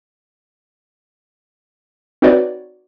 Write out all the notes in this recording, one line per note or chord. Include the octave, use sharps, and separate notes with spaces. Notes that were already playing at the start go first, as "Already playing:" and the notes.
C4 D#4 F#4 B4 C#5 D5